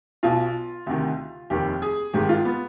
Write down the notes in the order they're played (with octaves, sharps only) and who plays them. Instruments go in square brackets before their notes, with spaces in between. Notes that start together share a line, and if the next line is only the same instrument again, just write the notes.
[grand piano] B1 B2 F4
D2 C3 D#3
F1 D#2 D#3 G4
G#4
G#1 G#2 D#3 G4
F4
B3